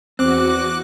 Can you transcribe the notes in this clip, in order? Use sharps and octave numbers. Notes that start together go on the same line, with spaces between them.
E2 C4 F#4 D6 F#6